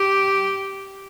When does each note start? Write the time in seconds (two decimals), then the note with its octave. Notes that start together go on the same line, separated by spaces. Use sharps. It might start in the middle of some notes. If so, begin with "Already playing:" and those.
Already playing: G4